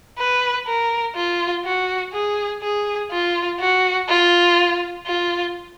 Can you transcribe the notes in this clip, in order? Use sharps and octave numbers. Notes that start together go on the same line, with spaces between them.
B4
A#4
F4
F#4
G#4
G#4
F4
F#4
F4
F4